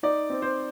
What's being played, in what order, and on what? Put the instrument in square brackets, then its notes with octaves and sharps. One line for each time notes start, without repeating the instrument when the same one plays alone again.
[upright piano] D#4 D5
C4
C5